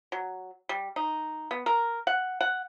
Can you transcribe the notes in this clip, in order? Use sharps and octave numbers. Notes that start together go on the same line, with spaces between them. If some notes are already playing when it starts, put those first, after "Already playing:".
F#3
G3
D#4
B3
A#4
F#5
F#5